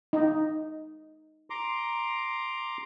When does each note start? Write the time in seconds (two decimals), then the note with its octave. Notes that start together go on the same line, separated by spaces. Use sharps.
0.13 D#4
1.50 A#5 C6 D6